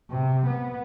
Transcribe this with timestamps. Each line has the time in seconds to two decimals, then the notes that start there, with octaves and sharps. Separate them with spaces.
0.10 C3
0.47 B3